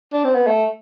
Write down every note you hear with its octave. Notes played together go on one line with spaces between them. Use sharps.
D4
C4
B3
A3